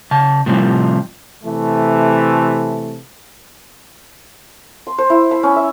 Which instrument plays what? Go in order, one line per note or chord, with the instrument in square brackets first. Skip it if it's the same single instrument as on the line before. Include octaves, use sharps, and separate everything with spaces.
[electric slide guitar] C#3 A5
A2 C3 F3 G3
[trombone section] C3 E3 A3
[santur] C6
C5
E4
B5
C#4
E5